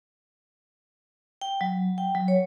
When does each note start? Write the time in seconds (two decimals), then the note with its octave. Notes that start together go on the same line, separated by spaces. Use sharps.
1.42 G5
1.61 F#3
1.98 G5
2.15 F#3
2.28 C#5